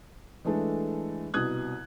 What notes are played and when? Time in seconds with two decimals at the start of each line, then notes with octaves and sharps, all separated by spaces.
0.45 E3 G#3 A3 D4 A4
1.34 C2 B2 D#6 F#6 G#6